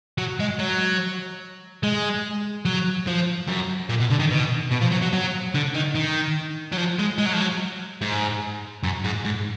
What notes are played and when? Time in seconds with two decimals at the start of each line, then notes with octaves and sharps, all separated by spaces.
0.18 F#3
0.40 G#3
0.59 F#3
1.83 G#3
2.65 F#3
3.07 F3
3.47 F#2
3.89 A#2
4.00 B2
4.10 D3
4.20 D#3
4.31 B2
4.72 B2
4.82 F3
4.92 F#3
5.02 F#3
5.13 F#3
5.55 D3
5.74 D#3
5.95 D#3
6.72 F#3
6.77 F3
6.99 G#3
7.18 G#3
7.26 F#3
7.33 F3
7.40 F#3
8.01 G#2
8.83 F#2
9.04 G#2
9.25 G#2